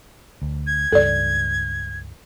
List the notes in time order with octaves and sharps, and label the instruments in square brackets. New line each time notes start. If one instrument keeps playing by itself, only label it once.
[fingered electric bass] D2
[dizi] G#6
[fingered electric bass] C#2 G2 [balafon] A4 D5